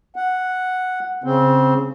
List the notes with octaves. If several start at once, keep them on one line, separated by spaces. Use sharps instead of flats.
F#5
C#3 C4